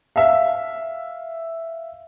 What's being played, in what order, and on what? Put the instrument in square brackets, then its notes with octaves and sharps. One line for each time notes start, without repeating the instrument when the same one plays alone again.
[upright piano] E5 F5